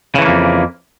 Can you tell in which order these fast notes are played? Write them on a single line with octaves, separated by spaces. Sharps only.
C#3 E3 A3 A#3 F2